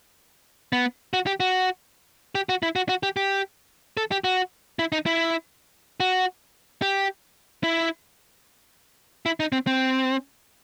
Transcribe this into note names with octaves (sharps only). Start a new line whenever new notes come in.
B3
F#4
G4
F#4
G4
F#4
E4
F#4
F#4
G4
G4
A4
G4
F#4
E4
D#4
E4
F#4
G4
E4
E4
D#4
C4
C4